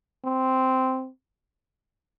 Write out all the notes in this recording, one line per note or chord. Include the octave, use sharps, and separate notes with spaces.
C4